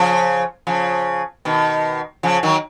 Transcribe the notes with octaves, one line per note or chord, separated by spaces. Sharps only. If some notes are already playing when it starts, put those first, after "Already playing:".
Already playing: C#3 F3
C#3 F3
B2 D#3
C#3 F3
D#3 F#3